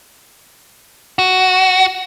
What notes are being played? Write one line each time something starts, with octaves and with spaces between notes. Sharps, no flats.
F#4